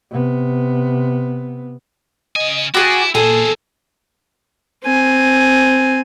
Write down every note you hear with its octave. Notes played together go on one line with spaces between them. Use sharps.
C3 B3
C#3 D#5 G#5
E4 F#4 G#4 G5 D6 A6
E2 A#2 G#4 A4 C5
C4 G#5